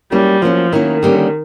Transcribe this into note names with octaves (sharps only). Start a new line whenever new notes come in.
F#3 G3 A#3 C#4 E4
F3 F#3 A#3 C#4 E4
D#3 F#3 A#3 C#4 E4
D3 G3 A#3 C#4